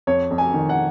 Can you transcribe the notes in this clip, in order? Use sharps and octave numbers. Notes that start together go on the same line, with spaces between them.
F2 C#5
F2
G#5
D#3
F#5